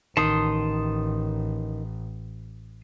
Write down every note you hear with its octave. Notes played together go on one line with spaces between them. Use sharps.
A1 D#3 A5 C6 D#6